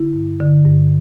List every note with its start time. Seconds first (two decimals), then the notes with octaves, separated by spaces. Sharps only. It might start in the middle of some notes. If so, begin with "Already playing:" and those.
Already playing: D3 E4
0.13 G2
0.40 D3
0.65 G2